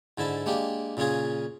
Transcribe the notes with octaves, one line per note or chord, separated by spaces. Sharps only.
G#2 D3 E4 A5
G#3 A#3 D4 G4
A#2 C#3 C#4 F4 G#4